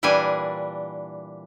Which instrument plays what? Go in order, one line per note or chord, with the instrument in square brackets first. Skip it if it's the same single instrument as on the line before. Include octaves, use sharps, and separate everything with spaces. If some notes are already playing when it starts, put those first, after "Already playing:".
[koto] A#2 E3 G3 D4 G#5